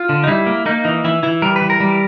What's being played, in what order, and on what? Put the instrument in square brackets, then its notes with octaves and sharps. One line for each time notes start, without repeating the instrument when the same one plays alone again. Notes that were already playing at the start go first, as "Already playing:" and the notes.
Already playing: [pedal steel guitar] F4
D3
D#4
G3 E4
A#3
A#3 D#4
E3 D#4
E3 E4
E3 E4
G3 A#4
B4
E3
A#4
G3